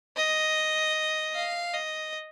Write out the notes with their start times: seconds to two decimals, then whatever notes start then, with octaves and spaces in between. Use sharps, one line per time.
0.17 D#5
1.35 F5
1.73 D#5